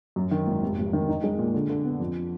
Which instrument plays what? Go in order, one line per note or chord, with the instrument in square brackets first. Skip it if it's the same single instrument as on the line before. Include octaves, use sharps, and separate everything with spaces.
[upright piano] F#2
D#3
G#1
F1
F1
D#3
D#4
G#3
A#2
D3
D3
B3
F2